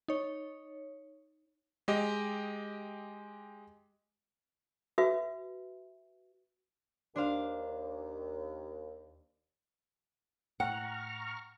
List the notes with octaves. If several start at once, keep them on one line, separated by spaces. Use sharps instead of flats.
D#4 C#5
G#3 G4 D#5
F#4 B4 E5
D#2 D4 C5 F5
A2 F#5 G5 A#5 C#6 F6